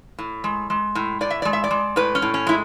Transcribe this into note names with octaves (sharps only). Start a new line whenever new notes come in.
A2
G#3
G#3
A2
A2 D5
E5
G#3 D5
E5
D5
G#3
A2 B4
C#4
A2
C#4
G#3 E4